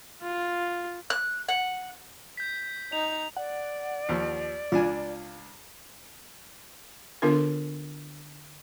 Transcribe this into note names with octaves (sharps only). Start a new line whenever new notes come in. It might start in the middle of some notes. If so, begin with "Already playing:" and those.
F4
F#6
F#5
G6 B6
D#4 F7
D5 F#5
D#2 F3
C#2 D4 F4 G#5
D3 B3 D4 F4 A4 A#4